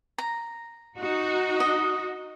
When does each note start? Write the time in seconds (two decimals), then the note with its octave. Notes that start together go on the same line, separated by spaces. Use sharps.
0.18 A#5
0.97 D#4 F#4
1.60 D#5